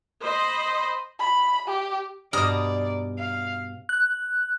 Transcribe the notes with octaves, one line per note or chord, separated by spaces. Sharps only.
C5 D#5 B5
B5
G4
G2 B2 D5 A#5 D#6 F6
F5
F#6